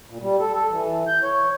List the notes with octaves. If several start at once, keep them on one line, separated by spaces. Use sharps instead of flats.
A#2
G3
A4
A4
E3
G6
C#5